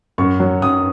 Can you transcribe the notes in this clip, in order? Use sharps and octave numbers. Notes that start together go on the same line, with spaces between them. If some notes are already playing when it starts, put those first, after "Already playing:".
F#2 C#6
F#3
F#2 D#6